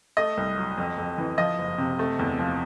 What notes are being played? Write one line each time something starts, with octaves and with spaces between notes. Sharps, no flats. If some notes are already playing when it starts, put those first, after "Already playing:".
A3 D#5
C2
F#3
F2
F2
E3
F3 D#5
F#1
C3
A3
E2
F3